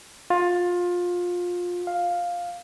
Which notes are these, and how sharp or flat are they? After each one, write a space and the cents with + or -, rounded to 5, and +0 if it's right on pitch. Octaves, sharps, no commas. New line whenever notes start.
F4 +20
F5 +5